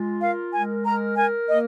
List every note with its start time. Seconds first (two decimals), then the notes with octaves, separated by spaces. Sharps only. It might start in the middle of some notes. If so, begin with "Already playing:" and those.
Already playing: G#3 F4
0.21 A#4 F5
0.53 G#3 G#5
0.85 A#4 A#5
1.16 A#4 G#5
1.48 A#3 D#5